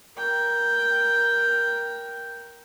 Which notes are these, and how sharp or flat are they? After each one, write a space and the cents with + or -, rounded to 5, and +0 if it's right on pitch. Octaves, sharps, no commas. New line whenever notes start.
A#4 +15 G5 +0